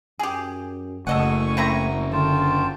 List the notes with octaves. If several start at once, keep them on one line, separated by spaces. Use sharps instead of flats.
F#2 G4 G#4
F#1 A3 A4 D#5 F#5 G#5 C#6
C4 E4 A#5
D3 F4 G5 A5